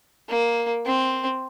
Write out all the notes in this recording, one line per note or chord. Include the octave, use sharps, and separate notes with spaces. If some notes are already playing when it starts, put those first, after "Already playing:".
A#3
C4